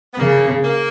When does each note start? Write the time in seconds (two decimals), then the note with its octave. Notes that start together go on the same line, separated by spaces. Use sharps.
0.14 B3
0.19 C#3 A#3
0.65 A#3